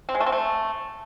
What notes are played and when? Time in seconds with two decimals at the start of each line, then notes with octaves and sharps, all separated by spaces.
0.09 C4
0.15 G#3
0.20 A3
0.26 C4
0.32 A3